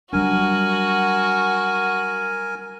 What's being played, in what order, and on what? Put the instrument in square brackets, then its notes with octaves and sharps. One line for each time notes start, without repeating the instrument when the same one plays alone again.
[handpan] F#3 G3 D4 [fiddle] F#4 [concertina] A#4 G#5